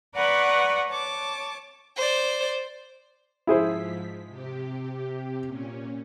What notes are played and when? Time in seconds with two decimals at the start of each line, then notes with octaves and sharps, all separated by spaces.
0.14 B4 D5 F#5 A#5 B5 C#6
0.89 C#5 A5 D6
1.96 C5 D5
3.47 G#2 F3 E4 G#4 C5 B6
4.27 C3 G4
5.46 A#2 C#4